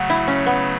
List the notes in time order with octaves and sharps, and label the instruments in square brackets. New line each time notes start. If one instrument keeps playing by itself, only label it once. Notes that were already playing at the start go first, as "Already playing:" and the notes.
Already playing: [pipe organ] C#3 F#3 A3 [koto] F#4
[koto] E4
C#4
B3